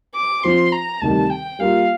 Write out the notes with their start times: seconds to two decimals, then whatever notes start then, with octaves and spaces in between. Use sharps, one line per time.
0.16 D6
0.44 F3 C4 F4 C5 C6
0.73 A#5
1.01 D2 C3 D#3 G3 A5
1.30 G5
1.59 G3 A#3 F4 F5